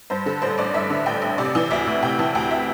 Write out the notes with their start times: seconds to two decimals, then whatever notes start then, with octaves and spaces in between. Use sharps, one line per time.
0.10 G2 C5
0.26 D3 A4
0.42 A1 C5
0.58 A1 D5
0.74 G2 E5
0.90 D3
1.06 A1 G5
1.22 A1
1.38 C3 D5
1.55 E3
1.71 D2 E5
1.87 D2
2.02 C3 G5
2.19 E3 A5
2.35 D2 G5
2.51 E5